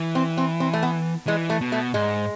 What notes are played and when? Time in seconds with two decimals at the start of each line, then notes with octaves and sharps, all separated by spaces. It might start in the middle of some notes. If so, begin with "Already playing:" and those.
Already playing: E3
0.15 C4
0.37 C4
0.60 C4
0.73 A3
0.83 B3
1.27 E3 G#3
1.50 A3
1.61 B2
1.72 A3
1.94 G#2 G#3